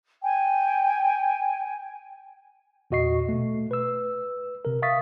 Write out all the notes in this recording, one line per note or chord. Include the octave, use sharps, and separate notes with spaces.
G5 G#5
E2 A#2 F#4 D#5 C#6 C7
B2 A3
B4 E6
C3 A#4
E5 F5 C#6 D#6 A6 B6